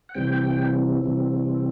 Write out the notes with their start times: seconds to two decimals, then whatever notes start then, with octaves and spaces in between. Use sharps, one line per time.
0.09 F#5
0.14 C3 E3 G3 C4 G5
1.04 C3 E3 G3 C4